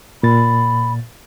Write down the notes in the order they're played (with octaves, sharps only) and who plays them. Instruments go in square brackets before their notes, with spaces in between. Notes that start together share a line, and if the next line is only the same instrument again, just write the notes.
[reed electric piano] A#2 A6 [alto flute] B5